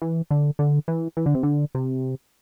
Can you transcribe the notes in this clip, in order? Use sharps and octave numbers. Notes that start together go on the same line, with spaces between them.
E3
D3
D3
E3
E3
D3
C3
D3
C3